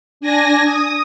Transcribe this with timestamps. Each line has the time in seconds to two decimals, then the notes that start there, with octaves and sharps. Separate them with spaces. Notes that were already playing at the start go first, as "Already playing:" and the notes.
0.21 D4 G#5 A#6
0.64 D#6